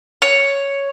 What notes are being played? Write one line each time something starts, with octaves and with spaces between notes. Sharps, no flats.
C#5